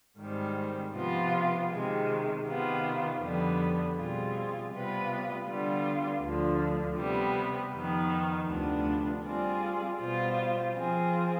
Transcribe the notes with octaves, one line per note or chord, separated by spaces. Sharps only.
G#2 D#3 G3 C4
C3 F3 B3 F4
C3 D#3 G#3
C3 D#3 B3 F4
F2 D3 G3 B3
B2 G3 C4 F4 G#4
C3 G3 B3 F4 B4
D3 G3 B3 F4
D2 D3 F3
C3 G3 B3
F2 D#3 B3
D2 C3 F3 B3 D4
G3 C4 F4 G#4 D5
B2 G3 B3 F4 C5
F3 C4 F4 G#4 C5